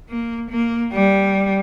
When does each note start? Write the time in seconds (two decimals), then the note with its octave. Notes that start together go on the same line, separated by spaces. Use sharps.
0.09 A#3
0.50 A#3
0.92 G3